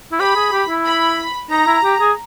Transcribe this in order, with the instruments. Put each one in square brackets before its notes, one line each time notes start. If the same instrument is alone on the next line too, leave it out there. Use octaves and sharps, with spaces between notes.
[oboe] E4
[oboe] G4 [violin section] B5
[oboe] G#4
G4
E4
[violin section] B5
[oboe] D#4 [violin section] A#5
[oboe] E4
G4
G#4